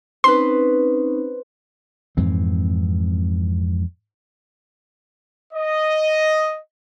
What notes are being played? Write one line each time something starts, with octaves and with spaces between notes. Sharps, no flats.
C4 C#4 D#4 B4 C5 C6
F2 G#2 E3 C4
D#5